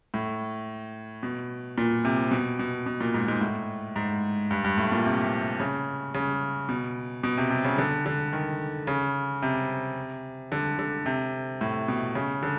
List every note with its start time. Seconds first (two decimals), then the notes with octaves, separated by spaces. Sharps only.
0.14 A2
1.23 B2
1.78 A#2
2.05 C3
2.31 B2
2.59 B2
2.86 B2
3.01 A#2
3.14 G#2
3.28 G#2
3.41 A2
3.96 G#2
4.51 G2
4.64 G2
4.78 A2
4.92 A#2
5.05 C3
5.60 C#3
6.14 C#3
6.69 B2
7.23 B2
7.38 C3
7.50 C3
7.64 C#3
7.78 D3
8.06 D3
8.33 D#3
8.87 C#3
9.42 C3
10.52 D3
10.79 D3
11.06 C3
11.61 A2
11.88 B2
12.15 C#3
12.43 D3